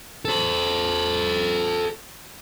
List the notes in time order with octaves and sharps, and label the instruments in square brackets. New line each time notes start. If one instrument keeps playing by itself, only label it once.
[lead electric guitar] A4 C5